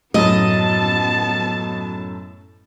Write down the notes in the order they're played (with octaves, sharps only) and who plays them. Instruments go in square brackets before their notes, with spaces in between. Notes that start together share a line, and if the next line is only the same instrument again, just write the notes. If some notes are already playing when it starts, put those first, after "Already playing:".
[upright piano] F#2 A2 F#3 [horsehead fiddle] B3 A5 [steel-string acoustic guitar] D#5